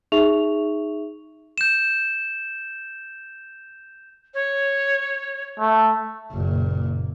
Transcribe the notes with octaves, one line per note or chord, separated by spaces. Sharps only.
D#4 G#4 E5 C#6 F7
G6 E7
C#5
A3
F#1 A#2